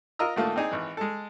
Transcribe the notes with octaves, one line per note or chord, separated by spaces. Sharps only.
F4 A#4 D#5 A#5 E6
G#2 D3 A3 A#3 F4
C4 D4 D#4 G#4
G#1 E3
G#3 A4